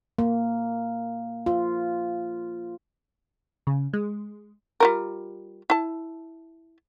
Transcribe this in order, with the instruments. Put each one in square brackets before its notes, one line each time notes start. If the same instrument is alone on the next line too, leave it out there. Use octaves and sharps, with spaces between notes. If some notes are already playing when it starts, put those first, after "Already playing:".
[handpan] A#3
F4
[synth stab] C#3
G#3
[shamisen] G3 F4 A#4
E4 A5